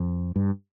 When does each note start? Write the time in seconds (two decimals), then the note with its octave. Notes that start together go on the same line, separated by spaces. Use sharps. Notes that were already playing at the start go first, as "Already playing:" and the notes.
Already playing: F2
0.36 G2